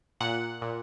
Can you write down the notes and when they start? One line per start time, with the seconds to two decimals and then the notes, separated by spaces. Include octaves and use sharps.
0.21 A#2 F#5
0.61 A#2